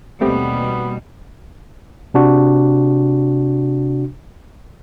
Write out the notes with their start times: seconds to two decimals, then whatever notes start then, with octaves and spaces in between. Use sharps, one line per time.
0.21 D#2 B2 G3 A3 B3 C4 G4
2.14 C3 D4 F#4